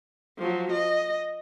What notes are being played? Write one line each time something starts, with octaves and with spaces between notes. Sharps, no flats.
F3 F#3
D#5